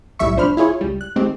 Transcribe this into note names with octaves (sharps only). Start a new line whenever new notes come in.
B1 A2 G3 E5 C#6
C2 F3 D4 C5 B5 F6
E4 F4 G#4 C#5
C#2 G3
F#6
D#3 G#3 A3 C4 G4